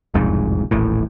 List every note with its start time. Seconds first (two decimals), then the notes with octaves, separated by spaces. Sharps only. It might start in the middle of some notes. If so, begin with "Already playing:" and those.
0.14 E1 C2 F2 G#2
0.71 D#1 A1 A2